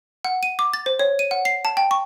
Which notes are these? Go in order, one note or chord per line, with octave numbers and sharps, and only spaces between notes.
F#5
D#7
D6
A6
C5
C#5
D#7
F#5
C7
A5
G5
C#6